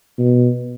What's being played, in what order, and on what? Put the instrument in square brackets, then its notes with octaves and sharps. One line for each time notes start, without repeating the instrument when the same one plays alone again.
[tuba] B2